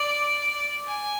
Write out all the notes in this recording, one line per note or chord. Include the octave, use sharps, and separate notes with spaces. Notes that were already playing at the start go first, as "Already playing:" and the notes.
Already playing: D5
G#5